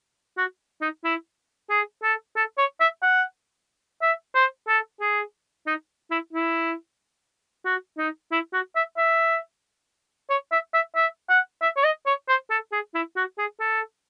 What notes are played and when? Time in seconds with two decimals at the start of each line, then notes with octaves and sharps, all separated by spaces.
0.37 F#4
0.81 D#4
1.04 E4
1.70 G#4
2.03 A4
2.36 A4
2.58 C#5
2.80 E5
3.02 F#5
4.01 E5
4.35 C5
4.68 A4
5.01 G#4
5.67 D#4
6.11 E4
6.33 E4
7.65 F#4
7.98 D#4
8.32 E4
8.53 F#4
8.75 E5
8.97 E5
10.30 C#5
10.51 E5
10.74 E5
10.96 E5
11.29 F#5
11.62 E5
11.76 C#5
11.84 D#5
12.06 C#5
12.28 C5
12.50 A4
12.72 G#4
12.94 E4
13.16 F#4
13.38 G#4
13.60 A4